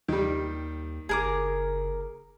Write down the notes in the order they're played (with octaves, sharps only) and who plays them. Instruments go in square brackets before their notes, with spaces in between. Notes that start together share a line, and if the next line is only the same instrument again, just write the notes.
[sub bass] D#2 [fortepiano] D#3 G3
[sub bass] F#1 [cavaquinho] G#4 A#4 D6